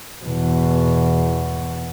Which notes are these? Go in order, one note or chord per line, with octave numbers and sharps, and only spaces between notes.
E2 B2